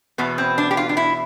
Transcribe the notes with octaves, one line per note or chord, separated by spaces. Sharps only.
E2 B2 B3
C4
D4
G4
F4
D4
E4